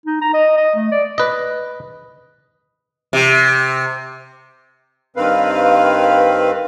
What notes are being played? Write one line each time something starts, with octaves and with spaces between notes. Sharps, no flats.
D#4
A#5
D#5
D#5
A3
D5
B4 D#5
C3
G2 D#3 C4 B4 F5